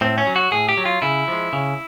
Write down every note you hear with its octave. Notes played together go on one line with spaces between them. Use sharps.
A2 C4
C#4
F#3
F#4
A2 G#4
G4
F#3
F4
C#3 E4
F3 G#3
C#3